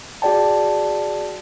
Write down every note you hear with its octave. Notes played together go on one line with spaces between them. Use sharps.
F#4 G#4 D5 G5 A5